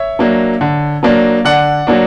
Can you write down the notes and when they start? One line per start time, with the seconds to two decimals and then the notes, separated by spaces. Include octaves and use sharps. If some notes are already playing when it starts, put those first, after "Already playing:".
Already playing: C#5 E5
0.19 F#3 A#3 D4
0.61 D3
1.03 F#3 A#3 D4
1.45 D3 D5 F#5
1.87 F#3 A#3 D4